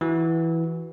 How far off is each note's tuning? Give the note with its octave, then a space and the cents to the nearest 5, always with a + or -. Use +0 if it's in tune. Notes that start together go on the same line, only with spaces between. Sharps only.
E3 +0 F#4 +5